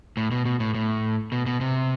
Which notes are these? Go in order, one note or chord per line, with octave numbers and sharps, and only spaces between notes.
A2
B2
B2
A2
A2
B2
B2
C3